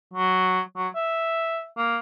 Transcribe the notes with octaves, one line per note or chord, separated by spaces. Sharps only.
F#3
F#3
E5
A#3